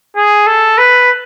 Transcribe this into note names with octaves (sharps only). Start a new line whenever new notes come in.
G#4
A4
B4